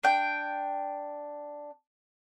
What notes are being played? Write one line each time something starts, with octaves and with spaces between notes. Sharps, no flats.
D4 G5